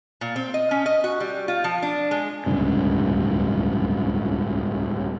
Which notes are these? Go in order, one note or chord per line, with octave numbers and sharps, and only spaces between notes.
A#2
C4
D#5
C#4
D#5
F#4
G3
F4
F3
D4
G#3
D1 C#2 G2 C3